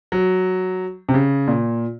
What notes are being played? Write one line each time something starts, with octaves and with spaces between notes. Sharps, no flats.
F#3
C3
C#3
A#2